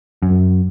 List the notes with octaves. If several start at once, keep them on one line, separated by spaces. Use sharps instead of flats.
F#2